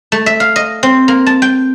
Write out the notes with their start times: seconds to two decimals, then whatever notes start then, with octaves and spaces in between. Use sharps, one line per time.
0.12 A3
0.26 E5
0.40 F5
0.56 D#5
0.83 C4
1.08 A#3
1.26 A5
1.42 G5